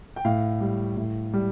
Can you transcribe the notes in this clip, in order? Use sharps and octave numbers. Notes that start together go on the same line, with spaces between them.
G5
A2 F5
G3
A2
G3